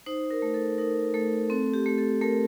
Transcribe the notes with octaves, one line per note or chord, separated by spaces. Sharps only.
D#4 C5
A#4
A3
A4
D#4 A#4
A3 A4
C4 A4
G4
A3
A4
A3 A#4